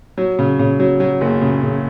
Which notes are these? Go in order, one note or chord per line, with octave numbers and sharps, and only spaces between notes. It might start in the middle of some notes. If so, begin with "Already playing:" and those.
F#3
C#3
C#3
F#3
F#3
F#1
C#3
C#3